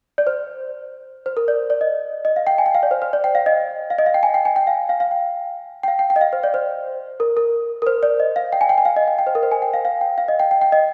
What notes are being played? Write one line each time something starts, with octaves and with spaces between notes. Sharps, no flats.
D5
C5
C5
A#4
D5
D5
D#5
D#5
F5
G5
G#5
G5
F5
D5
C5
C5
D5
G5
F5
D#5
F5
D#5
F5
G5
G#5
G5
G#5
G5
F5
F5
F5
G5
G5
F5
G5
G5
D#5
F5
C5
D5
C5
A#4
A#4
A#4
C5
D5
D#5
F5
G5
G#5
G5
G#5
F5
D#5
G5
G5
C5
A#4
C5
G#5
G5
F5
F5
G5
F5
D#5
G5
G5
G5
D#5